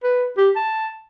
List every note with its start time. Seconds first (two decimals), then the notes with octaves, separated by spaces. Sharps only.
0.03 B4
0.37 G4
0.56 A5